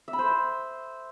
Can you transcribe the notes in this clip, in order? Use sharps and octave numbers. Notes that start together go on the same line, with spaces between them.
E5
B5
C5